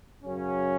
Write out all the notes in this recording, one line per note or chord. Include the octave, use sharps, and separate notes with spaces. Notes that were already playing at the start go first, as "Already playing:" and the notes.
F#2 C#3 F#3 C#4